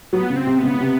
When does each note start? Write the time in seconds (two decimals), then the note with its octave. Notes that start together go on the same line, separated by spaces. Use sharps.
0.13 F#3 B3
0.30 C#3
0.36 C4
0.47 C3
0.58 B3
0.64 C#3
0.76 C#3
0.80 C3